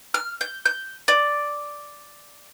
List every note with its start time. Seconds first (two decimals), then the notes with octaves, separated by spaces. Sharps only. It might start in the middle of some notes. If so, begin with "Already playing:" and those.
0.14 F6
0.41 G6
0.65 G6
1.08 D5